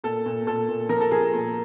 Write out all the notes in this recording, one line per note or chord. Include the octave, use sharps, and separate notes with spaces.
A#2 A4
A#2
A#2 A4
A#2
F3 A#4
A4
F3 G#4 A#4
A#2